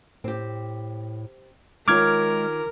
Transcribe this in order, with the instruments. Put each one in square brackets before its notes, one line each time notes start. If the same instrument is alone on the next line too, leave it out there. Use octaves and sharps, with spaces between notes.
[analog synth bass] A2 [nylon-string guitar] C4 G4
[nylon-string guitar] D#3 F4 C#5 [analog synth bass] G#3 [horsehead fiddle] A#4 [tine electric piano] D6 F6 G#6